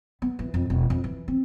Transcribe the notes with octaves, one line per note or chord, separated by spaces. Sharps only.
B3
E3
F2
E1
F2
E3
C4